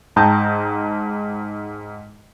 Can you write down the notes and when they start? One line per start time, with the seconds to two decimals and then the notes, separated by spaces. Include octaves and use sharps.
0.16 G#2 G5 A5 A#5 D#6 G6